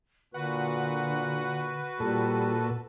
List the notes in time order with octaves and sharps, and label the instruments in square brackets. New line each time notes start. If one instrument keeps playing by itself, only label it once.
[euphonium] A#2 [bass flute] D3 [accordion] F#4 B4 [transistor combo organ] F#5
[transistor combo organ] A#2 A4 [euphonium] G3 [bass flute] F4